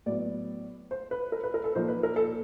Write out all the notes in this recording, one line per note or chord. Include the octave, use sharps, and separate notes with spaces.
A2 F#3 B3 D5
C5
B4
A#4
B4
A#4
A4
A#2 F3 A#3 D#4 C5
B4
A#4
A4